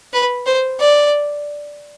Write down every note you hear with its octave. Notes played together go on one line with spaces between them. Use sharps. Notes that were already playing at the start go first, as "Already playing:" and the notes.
B4
C5
D5